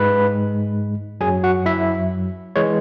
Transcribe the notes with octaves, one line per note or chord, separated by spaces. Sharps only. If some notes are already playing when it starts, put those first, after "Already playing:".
Already playing: G#2 G#3 B4 B5
F#2 F#3 G#4 G#5
F#4 F#5
E4 E5
E3 G#3 C#5